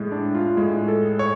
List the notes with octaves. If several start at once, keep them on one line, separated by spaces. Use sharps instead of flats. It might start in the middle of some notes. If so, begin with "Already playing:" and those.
Already playing: A2 G#3
D4
F4
A2 G#3 G#4
A4
C#5